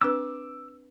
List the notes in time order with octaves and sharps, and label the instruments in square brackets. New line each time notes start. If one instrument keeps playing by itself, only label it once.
[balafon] C4 D4 B4 [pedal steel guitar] D6 E6